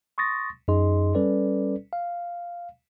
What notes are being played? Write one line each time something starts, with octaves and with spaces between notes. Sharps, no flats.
C6 C#6 D#6 A6 A#6
F#2 D#4 G#4 D#5 C6
G3 C#4 A4 B4 D5
F5